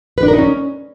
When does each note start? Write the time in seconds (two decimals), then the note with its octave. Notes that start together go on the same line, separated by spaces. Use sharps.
0.18 B4
0.23 D4
0.28 A#4
0.33 D#4
0.38 C#4